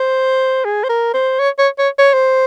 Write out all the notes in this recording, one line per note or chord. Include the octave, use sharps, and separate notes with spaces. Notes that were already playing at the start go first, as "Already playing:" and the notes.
Already playing: C5
G#4
C5
A#4
C5
C#5
C#5
C#5
C#5
C5